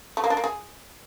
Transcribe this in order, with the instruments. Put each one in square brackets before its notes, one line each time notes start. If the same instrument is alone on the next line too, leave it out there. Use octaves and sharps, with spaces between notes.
[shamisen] A3
A#3
D4
A#3
G#4